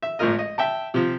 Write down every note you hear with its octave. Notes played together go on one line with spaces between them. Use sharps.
E5
G#1 A2 F3 F4 A#4 D#5
D#5
E5 G5 A5
C3 F3